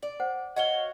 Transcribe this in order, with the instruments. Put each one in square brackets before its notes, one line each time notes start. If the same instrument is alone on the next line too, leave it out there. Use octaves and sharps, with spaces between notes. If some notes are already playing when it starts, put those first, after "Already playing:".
[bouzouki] D5
[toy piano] C5 F#5
[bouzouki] F#4 C#5 F5 [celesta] D#5 G7 [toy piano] F#5